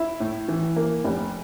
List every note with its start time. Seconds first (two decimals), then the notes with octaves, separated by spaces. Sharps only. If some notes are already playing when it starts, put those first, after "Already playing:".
Already playing: E4
0.20 A2
0.48 E3
0.76 A#3
1.05 F1